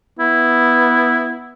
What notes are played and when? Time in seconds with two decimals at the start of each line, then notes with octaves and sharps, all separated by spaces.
0.19 B3 E4